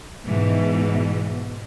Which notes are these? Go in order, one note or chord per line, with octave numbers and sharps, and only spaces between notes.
G#2 B2 E3